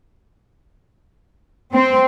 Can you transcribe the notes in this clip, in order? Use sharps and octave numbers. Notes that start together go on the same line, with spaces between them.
C4